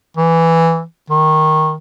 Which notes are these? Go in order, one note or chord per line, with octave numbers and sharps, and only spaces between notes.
E3
D#3